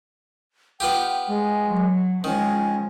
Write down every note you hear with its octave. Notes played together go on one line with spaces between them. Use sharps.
B3 F4 G4 G5
G#3
F#3
D#3 F3 G#3 C#4